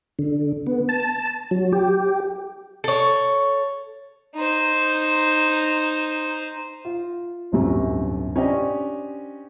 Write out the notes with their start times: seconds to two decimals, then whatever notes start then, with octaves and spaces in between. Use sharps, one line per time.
0.19 D3
0.67 B3
0.89 A5
1.51 F#3
1.73 G4
2.84 A4 C#5
4.35 D#4 C5
6.85 F4
7.52 D1 G1 F#2 C3 C#4
8.36 C#4 D4 G4 C5 D5 D#5